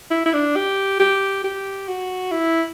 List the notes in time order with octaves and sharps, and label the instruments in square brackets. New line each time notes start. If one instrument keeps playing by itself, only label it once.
[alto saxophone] E4
E4
D4
G4
G4
G4
F#4
E4